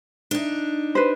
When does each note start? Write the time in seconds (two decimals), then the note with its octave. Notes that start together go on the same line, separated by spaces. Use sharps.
0.31 D4 D#4
0.95 B4 C5